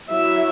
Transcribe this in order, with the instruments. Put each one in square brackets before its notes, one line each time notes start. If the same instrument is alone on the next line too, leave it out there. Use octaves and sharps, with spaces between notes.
[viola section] F#3 E4 E5